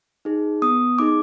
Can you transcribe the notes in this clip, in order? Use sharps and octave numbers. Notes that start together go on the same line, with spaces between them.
D#4 G#4
B3 D#6
D#4 G#4 D6